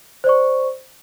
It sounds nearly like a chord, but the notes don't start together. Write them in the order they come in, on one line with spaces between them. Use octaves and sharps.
C5 D5 C#6